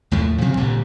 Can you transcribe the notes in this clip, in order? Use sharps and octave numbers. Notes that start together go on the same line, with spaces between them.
D#2 A2 F3 A3
C3 F3 G3 C4
G#1 A#2 D3 G3